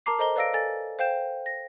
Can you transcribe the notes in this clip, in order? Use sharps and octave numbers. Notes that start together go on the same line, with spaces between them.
A#4 A5 A#5 D6 C7
A4 C5 D#5 A#5 G7
B4 D5 F5 E6 A#6 D7
A4 G#5 A6
C5 F5 G5 G6 E7
A#6